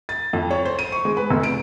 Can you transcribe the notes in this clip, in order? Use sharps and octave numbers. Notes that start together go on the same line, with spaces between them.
A6
F2
C#5
C5
D#7
C#6
G#3
B4
F1
D7